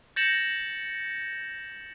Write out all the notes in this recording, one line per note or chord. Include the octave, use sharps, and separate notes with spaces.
G6 A6 A#6 C#7 E7 F#7